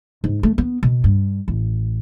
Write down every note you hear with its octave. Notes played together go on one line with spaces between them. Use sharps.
G#2
A3
B3
B2
G2
A1